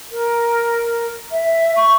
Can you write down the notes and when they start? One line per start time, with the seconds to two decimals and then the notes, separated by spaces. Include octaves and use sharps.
0.11 A#4
1.32 E5
1.76 C#6